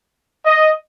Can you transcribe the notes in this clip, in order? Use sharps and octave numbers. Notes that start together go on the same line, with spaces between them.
D#5